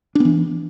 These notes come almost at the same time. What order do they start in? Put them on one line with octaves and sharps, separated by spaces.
D4 B3 E3